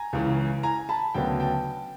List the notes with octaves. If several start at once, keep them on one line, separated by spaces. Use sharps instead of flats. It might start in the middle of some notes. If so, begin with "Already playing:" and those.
Already playing: G#5 A#5
C#2 C#3 E3
G#5 A#5
A5 B5
D2 C#3 F#3 B3 G5 A5
G5 A5